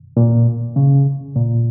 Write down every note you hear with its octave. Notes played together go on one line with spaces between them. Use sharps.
A#2
C#3
A#2